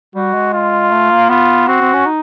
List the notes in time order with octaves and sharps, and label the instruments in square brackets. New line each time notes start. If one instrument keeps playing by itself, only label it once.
[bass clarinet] G3 [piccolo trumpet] F#4
[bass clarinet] G#3
[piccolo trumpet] F4
[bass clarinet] A3
A#3
[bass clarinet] B3 [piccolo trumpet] F4
[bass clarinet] C4 [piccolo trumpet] F#4
[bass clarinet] C4
C#4
D#4